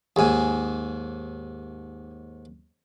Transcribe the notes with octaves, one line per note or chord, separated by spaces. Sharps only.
D#2 G#2 G#4 G#5